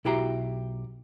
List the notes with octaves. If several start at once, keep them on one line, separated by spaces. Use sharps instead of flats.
B1 E4 F#4 G4 E5 A#5